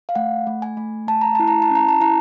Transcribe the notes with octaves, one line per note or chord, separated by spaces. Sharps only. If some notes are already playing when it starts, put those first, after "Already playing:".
F5
A3 F#5
A3
G#5
A3
A3 A5
A#5
E4 A5
A#5
A5
C#4 A#5
A5
E4 A#5